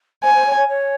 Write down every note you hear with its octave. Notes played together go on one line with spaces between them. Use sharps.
C5 G#5
C5
C#5
C#5
C#5